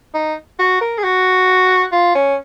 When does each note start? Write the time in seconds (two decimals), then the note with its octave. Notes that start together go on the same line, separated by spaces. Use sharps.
0.14 D#4
0.59 F#4
0.81 A#4
0.98 G#4
1.04 F#4
1.92 F4
2.15 C#4